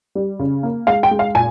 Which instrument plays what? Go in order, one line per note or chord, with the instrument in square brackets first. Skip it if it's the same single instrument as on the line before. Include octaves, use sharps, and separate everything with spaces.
[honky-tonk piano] G3
C#3
A#3
G#3 F5
G5
G#3
F5
A#2 G#5